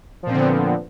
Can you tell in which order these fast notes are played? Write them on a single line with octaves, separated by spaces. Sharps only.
F3 A#2 C4 D3 B3